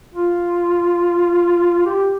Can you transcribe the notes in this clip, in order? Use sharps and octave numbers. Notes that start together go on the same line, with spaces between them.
F4
G4